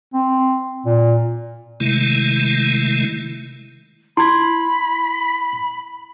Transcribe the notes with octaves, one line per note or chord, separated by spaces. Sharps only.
C4
A#2
C3 D#3 G#3 A3 E4
E4 B5 C6 G#6